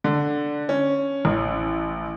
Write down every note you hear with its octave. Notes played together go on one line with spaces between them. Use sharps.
D3
C#4
A1